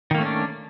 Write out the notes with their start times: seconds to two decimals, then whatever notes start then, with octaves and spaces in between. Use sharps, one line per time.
0.11 D#3
0.15 A#3
0.18 A3
0.22 C#4
0.25 D4